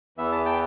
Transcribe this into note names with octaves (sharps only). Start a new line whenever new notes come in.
E2 E3 B3 E5
A5
G5